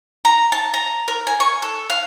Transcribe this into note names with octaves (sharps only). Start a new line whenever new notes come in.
A#5
A5
A#5
A#4
G#5
C#6
A4
F5